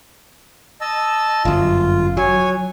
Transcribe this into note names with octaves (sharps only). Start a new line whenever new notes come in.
D#5 A5 E6
G1 F#2 F4
F#3 C#5 G#5